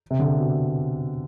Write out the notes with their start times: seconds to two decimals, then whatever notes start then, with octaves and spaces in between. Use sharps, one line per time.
0.11 C3
0.19 D3
0.37 B2